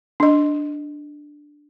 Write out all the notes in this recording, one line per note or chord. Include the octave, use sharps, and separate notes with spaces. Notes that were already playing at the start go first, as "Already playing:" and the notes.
D4 D#5